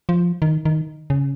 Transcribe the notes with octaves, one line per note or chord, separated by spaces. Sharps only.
F3
D#3
D#3
C#3